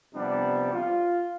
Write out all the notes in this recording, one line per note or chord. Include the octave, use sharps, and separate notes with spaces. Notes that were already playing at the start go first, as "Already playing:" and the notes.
C3 F3 G3 B3 D4
F4